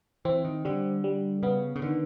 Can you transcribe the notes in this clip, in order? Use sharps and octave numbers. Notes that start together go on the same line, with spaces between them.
E3 C4
D#3
D3 G3
G3
C#3 B3
C#3
D3 D#3